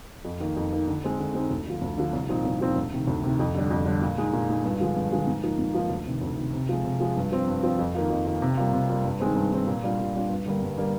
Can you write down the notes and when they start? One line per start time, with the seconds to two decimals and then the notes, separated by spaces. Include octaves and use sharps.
0.25 F2
0.40 D#3 A#3 D#4
0.57 F2
0.72 D#3 A#3 D#4
0.88 D3
1.03 G#3 C4 D#4
1.19 D3
1.35 G#3 C4 D#4
1.51 D2
1.66 D3 F3
1.82 D2
1.98 D3 F3
2.13 C2
2.29 A#2 F3 C4 D#4
2.45 C2
2.61 A#2 F3 C4 D#4
2.76 D2
2.92 C3 D#3
3.07 D2
3.23 C3 D#3
3.40 F2
3.55 D3 G3 D4
3.70 F2
3.86 D3 G3 D4
4.02 A#2
4.18 G#3 D#4
4.33 A#2
4.49 G#3 D#4
4.64 G2
4.80 D3 F3 G#3
4.96 G2
5.12 D3 F3 G#3
5.27 G#2
5.43 F3 A#3 D#4
5.59 G#2
5.74 F3 A#3 D#4
5.90 D2
6.06 C3 D#3
6.22 D2
6.37 C3 D#3
6.53 C3
6.69 F3 G#3
6.84 C3
7.00 F3 G#3
7.16 G2
7.32 F3 C4
7.47 G2
7.63 F3 C4
7.79 F2
7.95 D#3 A#3 F4
8.10 F2
8.26 D#3 A#3 F4
8.42 C3
8.57 G3 A#3 F4
8.73 C3
8.89 G3 A#3 F4
9.04 G2
9.20 D#3 G#3 C4
9.36 G2
9.51 D#3 G#3 C4
9.67 A#2
9.83 G3 D4 F4
9.99 A#2
10.15 G3 D4 F4
10.30 G2
10.46 D3 G3 A#3
10.62 G2
10.78 D3 G3 A#3